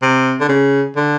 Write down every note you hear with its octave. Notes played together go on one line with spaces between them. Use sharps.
C3
D3
C#3
D3